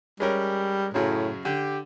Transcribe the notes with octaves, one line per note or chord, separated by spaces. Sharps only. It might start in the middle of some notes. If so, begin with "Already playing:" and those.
G3 G#3 C#4 A#4
F#2 A2 C#3 F#3
D3 G4